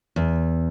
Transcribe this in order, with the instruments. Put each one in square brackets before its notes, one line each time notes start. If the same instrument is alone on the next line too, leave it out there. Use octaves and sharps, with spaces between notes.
[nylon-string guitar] E2